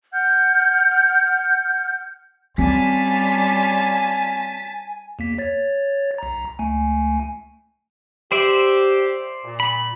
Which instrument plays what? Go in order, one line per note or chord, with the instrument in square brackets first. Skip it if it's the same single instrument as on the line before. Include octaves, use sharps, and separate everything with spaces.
[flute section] F#5 F6 G6
[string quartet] G3 C#4 F4 [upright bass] C4 [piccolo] G#5 [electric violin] A5 B6
[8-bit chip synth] E2 A#3 B6
C#5 A6
B1 A#5
C#2 A3 G#5
[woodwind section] G4 [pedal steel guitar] C5 D5 E5
[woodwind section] A#2
[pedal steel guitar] B5